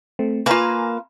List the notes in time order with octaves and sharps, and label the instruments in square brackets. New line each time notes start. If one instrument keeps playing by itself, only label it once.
[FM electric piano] A3 C4
[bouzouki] A#3 F5 [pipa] F4 B4 [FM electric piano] G#5 A#5